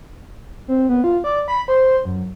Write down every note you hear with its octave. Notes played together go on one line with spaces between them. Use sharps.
C4
B3
F4
D5
B5
C5
F#2